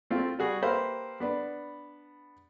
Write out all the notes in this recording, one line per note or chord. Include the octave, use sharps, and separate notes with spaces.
A3 C4 F4
G3 F#4 G#4
A#3 G4 B4 C5 E5 F5
B3 D4 B4